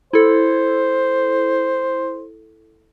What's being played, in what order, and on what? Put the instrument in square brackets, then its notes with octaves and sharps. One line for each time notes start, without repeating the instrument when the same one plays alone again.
[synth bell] E4 A4 [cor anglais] C5